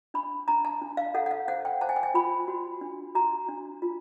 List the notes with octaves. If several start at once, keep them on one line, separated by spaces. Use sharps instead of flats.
D4 B5
D4 A#5
A5
D4
F5
A4 F#5
F#5
F5
C5 F#5
G5
C5 A5
G#5
G5
G#5
F4 B5
F#4
D4
F#4 A#5
D4
F4